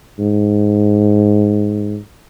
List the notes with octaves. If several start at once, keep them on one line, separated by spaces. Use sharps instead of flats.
G#2